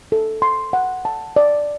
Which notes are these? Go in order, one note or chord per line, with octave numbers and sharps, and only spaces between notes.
A4
C6
F#5
A5
D5